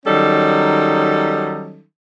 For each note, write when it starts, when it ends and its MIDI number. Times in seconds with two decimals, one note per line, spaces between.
0.06 1.82 51
0.06 1.82 54
0.06 1.82 55
0.06 1.82 61
0.06 1.82 63
0.06 1.82 69